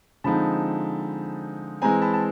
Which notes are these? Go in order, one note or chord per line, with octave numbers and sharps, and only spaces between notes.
D3 F3 G#3 C4 D#4 A5 B5
E3 G#3 C4 G#5 A#5
A5 B5
A5